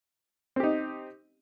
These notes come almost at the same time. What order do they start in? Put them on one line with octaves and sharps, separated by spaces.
C4 G4 D#4